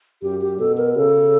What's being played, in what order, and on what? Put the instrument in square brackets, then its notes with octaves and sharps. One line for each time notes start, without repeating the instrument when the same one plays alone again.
[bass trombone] F#2 [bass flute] G4
[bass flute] G4
[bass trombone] B2 [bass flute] A4
[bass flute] A#4
[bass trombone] C#3 [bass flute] A4